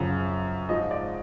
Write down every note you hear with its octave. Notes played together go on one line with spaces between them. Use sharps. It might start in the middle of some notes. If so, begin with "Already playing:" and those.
Already playing: F#2 C#3 F3
G#2 F3 D#5
D5